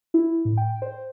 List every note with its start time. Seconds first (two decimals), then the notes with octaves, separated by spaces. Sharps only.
0.14 E4
0.45 A2
0.57 G5
0.82 C5